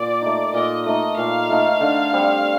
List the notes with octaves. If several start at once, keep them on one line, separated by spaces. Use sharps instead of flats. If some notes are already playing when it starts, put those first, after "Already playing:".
Already playing: A#2 D5
A3 D#4
A#2 D#5
A3 D#4 D#5
A#2 F5
A3 D#4
D3
G3 C4